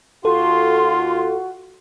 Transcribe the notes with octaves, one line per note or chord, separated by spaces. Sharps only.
D#2 F4 F#4 A4 C6